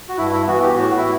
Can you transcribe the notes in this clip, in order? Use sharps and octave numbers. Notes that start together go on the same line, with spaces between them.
F#4
G2 E4
E4
E3 B3 F#4
G4
A2 F#4
E4